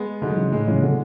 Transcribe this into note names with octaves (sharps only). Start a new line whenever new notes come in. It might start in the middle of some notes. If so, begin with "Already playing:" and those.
Already playing: G#3 B3
G#2 D3 F#3
C#3 E3
A2 G#3
C#3 E3
B2 D3